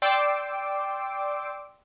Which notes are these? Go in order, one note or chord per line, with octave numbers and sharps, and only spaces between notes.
D5 G5 C6 D6 E6 D7